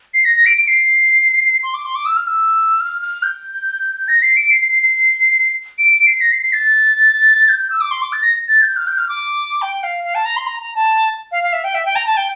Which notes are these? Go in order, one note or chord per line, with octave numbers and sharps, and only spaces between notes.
C7
A#6
A#6
D7
D7
C7
C6
D6
C6
D6
E6
F6
E6
F6
F6
G6
A#6
C7
D7
C7
C7
C7
C7
D7
D7
C7
A#6
C7
C7
A6
G6
G6
E6
D6
C6
D6
A6
A#6
A6
G6
F6
G6
F6
D6
G5
F5
F5
A5
A#5
C6
A#5
A#5
A5
F5
F5
E5
G5
E5
G5
A#5
A5
G5